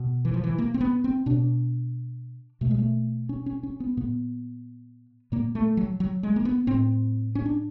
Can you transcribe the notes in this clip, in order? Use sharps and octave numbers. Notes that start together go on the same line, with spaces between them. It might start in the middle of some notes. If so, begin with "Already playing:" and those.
Already playing: B2
E3
F3
E3
A#3
C4
B3
C4
B2 D4
B2 A3
G#3
A3
C#4
C#4
C#4
B3
A#2 B3
A#2 A#3
A3
F#3
F#3
G#3
A#3
B3
A2 C4
C#4
D4